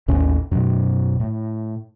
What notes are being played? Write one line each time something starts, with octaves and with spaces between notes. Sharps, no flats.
A1 D#2 A2 C#4
F#2 B2
A2